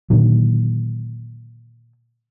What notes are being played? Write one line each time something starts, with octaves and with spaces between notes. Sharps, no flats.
A#2 D3 D#3 F#3